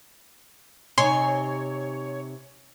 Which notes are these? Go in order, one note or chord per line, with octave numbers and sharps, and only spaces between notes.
C3 D#4 C#5 G#5 C6